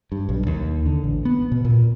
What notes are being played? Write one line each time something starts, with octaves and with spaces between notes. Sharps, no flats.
G2
B1
D#2
D3
A1
B3
B2
A#2